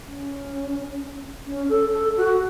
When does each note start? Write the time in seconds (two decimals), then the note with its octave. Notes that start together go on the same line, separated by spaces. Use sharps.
0.05 C#4
1.47 C#4
1.69 A4
1.93 A4
2.17 F#4